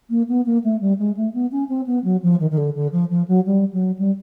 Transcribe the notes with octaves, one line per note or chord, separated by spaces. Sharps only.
A#3
B3
A#3
A3
G3
G#3
A3
B3
C#4
C4
B3
F#3
F3
D#3
D#3
D3
D3
F3
F3
F#3
G3
F#3
G3